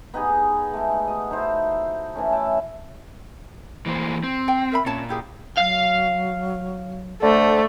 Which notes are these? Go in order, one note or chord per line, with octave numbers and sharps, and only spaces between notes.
B3 D#4 G4 G#4
G#3 A3
F#4 D#5
D#4 E4 C5
E3 A3 C#4
E5 G5 A5
E3 A#3 C5
C4
G5
A#4 E5 B5
A#2 C#4 C#5 A5
E4 G4 G#4
F#3 F5
D3 A3 C5